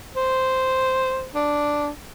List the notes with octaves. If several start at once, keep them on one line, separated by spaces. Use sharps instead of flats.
C5
D4